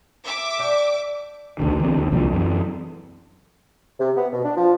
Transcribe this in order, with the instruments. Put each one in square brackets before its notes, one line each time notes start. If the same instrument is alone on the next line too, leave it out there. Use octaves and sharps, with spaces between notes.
[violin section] E5 D6
[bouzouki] D4 G4
[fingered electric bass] D2 D3 D#3
D3 E3 A3 C4
D#2
C2 A#2 E3 F3
F#2 E3
[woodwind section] C3
B3
B2
D4
F3